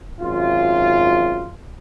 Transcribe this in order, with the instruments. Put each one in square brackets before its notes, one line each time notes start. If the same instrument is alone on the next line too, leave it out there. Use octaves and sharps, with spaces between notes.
[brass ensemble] G#1 F#2 F4